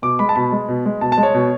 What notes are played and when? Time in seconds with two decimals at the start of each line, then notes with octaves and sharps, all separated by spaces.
0.02 B2 D6
0.19 G#3 B5
0.29 A5
0.36 B2 B5
0.52 G#3
0.68 B2
0.85 G#3
1.01 B2 A5
1.12 A5
1.17 G#3
1.23 C#5
1.34 B2